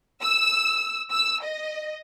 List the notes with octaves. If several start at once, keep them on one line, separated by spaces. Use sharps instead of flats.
E6
E6
D#5